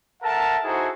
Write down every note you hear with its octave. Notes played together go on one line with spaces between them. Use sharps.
A4 A#4 E5 F#5 A5
D#4 E4 F#4 G#4 A4 C5